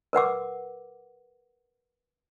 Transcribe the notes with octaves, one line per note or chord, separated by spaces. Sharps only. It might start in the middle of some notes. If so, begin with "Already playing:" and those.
A#4 B4 F#5 D6